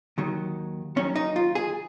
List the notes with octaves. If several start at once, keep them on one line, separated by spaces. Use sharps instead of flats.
D#2 D#3 F#3
D#2 D#3 F#3 C#4
D#4
F4
G#4